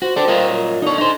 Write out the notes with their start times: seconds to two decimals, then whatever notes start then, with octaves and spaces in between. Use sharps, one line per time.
0.02 F#4 C5
0.16 C4 A4 D5
0.28 F4 A#4 D#5
0.49 F#2
0.82 D3 D#4 C#5
0.98 D#4 C5